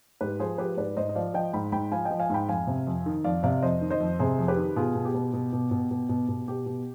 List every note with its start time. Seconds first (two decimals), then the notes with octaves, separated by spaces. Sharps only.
0.21 G#2 G4 B4
0.39 F3 G#4 C5
0.58 F3 G4 B4
0.77 G#2 B4 D5
0.97 G#2 C5 D#5
1.09 D#5
1.15 F3 D5 F5
1.34 F3 D#5 G5
1.53 G#2 G5 B5
1.72 G#2 G5 B5
1.92 F3 F5 G#5
2.05 D#5 G5
2.11 F3
2.20 F5 G#5
2.30 G#2 G5 B5
2.48 F2 F5 G#5
2.67 C3
2.87 F2
3.06 D#3
3.24 F2 D5 F5
3.43 C3 D5 F5
3.62 F2 C5 D#5
3.81 D#3
3.90 C5 D#5
4.00 F2
4.19 C3 G#4 C5
4.39 F2
4.48 G4 B4
4.57 D#3
4.76 B2 F4 G#4
4.95 B2
5.05 G4
5.15 B2
5.33 B2
5.53 B2
5.71 B2
5.91 B2
6.09 B2
6.28 B2
6.48 B2 G4
6.66 B2